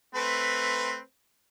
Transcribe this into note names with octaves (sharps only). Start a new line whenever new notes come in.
A3 C4 B4